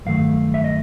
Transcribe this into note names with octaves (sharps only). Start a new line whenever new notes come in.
G2 D#3 F#3 A3 F5
E5
D#5